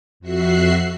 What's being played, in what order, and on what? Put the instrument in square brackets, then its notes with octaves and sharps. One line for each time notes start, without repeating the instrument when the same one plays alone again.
[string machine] F2 F#4 E5 F#6 C7